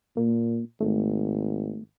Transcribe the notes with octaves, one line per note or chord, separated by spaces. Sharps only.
A#2 A#3
G#1 A3